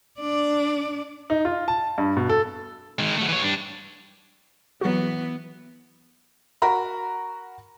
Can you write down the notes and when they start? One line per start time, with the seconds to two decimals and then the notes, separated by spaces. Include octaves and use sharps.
0.20 D4 D5
1.30 D#4
1.45 F4
1.68 A5
1.98 G2
2.17 B2
2.29 A4
2.99 D#3 G#3
3.17 F#3 A3
3.29 E3 C#5
3.42 G3 D4
4.81 E3 F#3 B3 F#4
6.62 F#4 A#4 A#5 B5